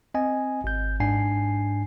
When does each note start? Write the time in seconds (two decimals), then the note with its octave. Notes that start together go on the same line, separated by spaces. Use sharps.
0.14 C4 D#5 G#5
0.64 G#1 G6
1.00 G#2 D4 G#5 C7